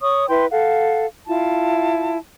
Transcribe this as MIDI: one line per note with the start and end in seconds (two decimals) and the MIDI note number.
0.01 0.27 73
0.01 0.27 85
0.01 0.27 87
0.28 0.46 64
0.28 0.46 71
0.28 0.46 79
0.28 0.46 84
0.50 1.05 69
0.50 1.05 77
0.50 1.05 78
1.27 2.17 64
1.27 2.17 65
1.27 2.17 81